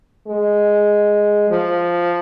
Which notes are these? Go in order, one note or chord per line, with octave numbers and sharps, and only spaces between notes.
G#3
F3